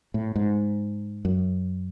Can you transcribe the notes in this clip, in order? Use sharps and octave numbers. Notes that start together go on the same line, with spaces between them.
A2
G#2
F#2